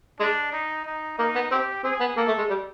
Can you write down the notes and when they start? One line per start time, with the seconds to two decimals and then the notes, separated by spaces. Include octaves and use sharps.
0.20 G#3 D4
0.53 D#4
0.85 D#4
1.18 A#3 D#4
1.35 B3
1.51 C4 G4
1.84 C4 G#4
2.00 B3
2.16 A#3 A4
2.28 A3
2.38 G#3
2.50 G3